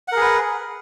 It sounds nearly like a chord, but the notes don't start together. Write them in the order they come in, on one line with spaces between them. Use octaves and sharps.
F#5 A#4 G#4 B4